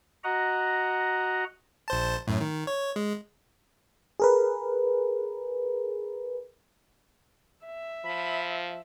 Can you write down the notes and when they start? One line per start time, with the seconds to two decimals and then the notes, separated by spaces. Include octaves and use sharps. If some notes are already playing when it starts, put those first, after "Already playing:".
0.24 F#4 D#5 F#5 A#5
1.88 A#1 C5 A5
2.27 F#2 A2
2.41 D#3
2.67 C#5
2.96 G#3
4.20 G#4 A#4 B4
7.66 E5
8.05 F3 B5